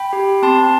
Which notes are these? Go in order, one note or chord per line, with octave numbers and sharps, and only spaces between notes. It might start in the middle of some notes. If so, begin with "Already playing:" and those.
Already playing: G5 B5
G4
C4 A5 C6